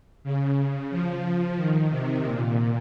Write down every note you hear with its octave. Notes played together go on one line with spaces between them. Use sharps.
C#3
F3
D#3
C3
A#2